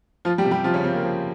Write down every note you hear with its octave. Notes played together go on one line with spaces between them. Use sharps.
F3 F4
G3 G4
C3
G3 G4
C3 F3 F4
C#3 C#4
F3 C4
A#3
F3